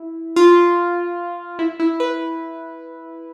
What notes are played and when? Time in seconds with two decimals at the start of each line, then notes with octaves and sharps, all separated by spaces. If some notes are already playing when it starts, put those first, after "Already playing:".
Already playing: E4
0.36 F4
1.59 E4
1.80 E4
2.00 B4